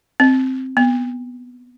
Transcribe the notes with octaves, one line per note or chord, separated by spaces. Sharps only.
C4
B3